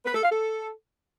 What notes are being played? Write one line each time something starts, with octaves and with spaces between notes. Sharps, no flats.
B4
A4
F5
A4